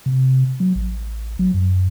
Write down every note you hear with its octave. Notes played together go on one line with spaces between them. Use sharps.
C3
F#3
A1
F#3
F#2